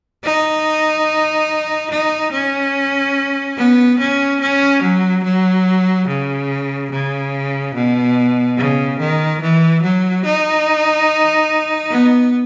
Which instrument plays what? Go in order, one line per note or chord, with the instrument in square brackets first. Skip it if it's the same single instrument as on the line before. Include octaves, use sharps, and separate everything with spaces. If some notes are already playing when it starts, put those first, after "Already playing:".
[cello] D#4
D#4
C#4
B3
C#4
C#4
F#3
F#3
C#3
C#3
B2
C#3
D#3
E3
F#3
D#4
B3